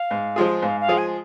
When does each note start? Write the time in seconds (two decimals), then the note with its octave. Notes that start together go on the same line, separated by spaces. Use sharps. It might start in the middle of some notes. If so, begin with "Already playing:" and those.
Already playing: F5
0.11 G#2
0.36 F3 G#3 F4 G#4
0.62 G#2 F5
0.81 F5
0.88 F3 G#3 F4 G#4
0.98 G#5